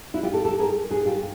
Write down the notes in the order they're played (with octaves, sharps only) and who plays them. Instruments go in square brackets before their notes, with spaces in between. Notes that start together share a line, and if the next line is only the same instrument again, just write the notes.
[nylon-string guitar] E4 F#4
F4 G4
G4 A4
G4 A4
G#4 A#4
F#4 G#4
G#4
F4 G4